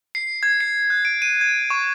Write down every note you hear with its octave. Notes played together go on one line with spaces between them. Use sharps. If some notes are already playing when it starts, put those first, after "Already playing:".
C7
G#6
C7
F#6
D7
D#7
G#6
C#6